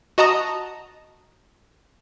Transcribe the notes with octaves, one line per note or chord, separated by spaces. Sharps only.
F#4 D#5 A5 A#5 D#6